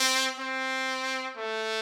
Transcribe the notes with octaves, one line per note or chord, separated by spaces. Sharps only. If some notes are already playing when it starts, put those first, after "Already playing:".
Already playing: C4
C4
A3